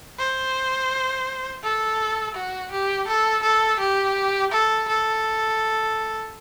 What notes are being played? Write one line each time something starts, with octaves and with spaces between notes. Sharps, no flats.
C5
A4
F#4
G4
A4
A4
G4
A4
A4